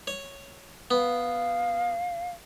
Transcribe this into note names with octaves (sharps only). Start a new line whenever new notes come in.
C#5
B3 F5